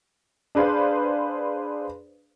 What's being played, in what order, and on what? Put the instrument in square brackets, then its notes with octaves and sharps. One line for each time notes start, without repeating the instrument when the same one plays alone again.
[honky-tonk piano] D4 G#4 B4 C5 F5